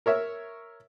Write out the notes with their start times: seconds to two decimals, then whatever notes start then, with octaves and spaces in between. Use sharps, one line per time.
0.06 A#4 C#5 E5